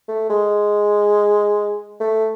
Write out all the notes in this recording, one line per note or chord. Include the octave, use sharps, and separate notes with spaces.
A3
G#3
A3